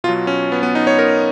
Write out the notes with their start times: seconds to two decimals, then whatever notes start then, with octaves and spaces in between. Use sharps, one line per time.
0.04 B2 F4
0.09 F#3
0.27 C#4
0.52 B3
0.63 B3
0.75 D#4
0.87 C#5
0.99 A#4